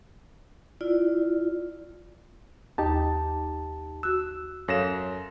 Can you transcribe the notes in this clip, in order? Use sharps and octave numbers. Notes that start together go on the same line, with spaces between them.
E4 F4 D5
D#2 D#4 G4 A5
F#4 E6 F#6
F#2 A4 C#5 F5 A#6 E7